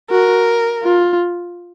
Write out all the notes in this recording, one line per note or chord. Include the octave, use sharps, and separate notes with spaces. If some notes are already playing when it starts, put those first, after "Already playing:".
F#4 A#4
F4